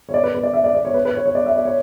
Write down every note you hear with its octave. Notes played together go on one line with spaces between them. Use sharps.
C#5
D5
B4
B4
D5
E5
D5
D5
C#5
B4
B4
C#5
C#5
D5
E5
D5
C#5